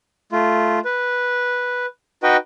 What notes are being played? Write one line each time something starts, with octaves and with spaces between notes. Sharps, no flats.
A3 F4
B4
D#4 F#4 B4 D#5 G5